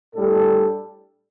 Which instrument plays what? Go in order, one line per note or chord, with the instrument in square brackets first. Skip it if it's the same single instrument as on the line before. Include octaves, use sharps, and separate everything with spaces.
[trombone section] A2 G3 D4 A4